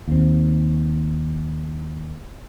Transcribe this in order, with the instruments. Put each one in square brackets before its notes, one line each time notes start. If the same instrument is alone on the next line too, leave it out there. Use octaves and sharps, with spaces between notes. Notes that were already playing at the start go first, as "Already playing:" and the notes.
[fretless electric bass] D#2 C4